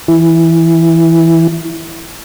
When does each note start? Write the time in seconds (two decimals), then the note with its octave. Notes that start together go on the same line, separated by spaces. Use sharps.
0.08 E3 E4